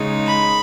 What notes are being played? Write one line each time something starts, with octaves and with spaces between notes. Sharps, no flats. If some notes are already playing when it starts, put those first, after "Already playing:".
Already playing: C#3 G#3 D#4
B5